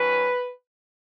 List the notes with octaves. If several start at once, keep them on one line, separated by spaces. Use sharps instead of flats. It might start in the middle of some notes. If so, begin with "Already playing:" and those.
Already playing: D#3 F#3 C#4 B4